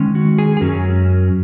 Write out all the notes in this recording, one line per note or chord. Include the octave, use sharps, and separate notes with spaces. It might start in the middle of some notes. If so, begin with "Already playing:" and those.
Already playing: D#3 G#3 C#4
F#4
G#4
G#4
F#2 F#3 C#4 A#4